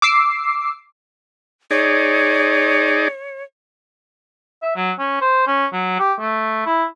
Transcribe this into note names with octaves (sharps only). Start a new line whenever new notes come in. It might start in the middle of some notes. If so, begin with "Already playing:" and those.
D6 E6 C7
D#4 G#4 C#5 D5
E5
F#3
C#4
C5
C#4
F#3
G4
A3
E4